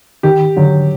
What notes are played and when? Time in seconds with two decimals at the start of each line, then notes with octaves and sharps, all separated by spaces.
0.23 D#3 G4
0.57 D3 F#3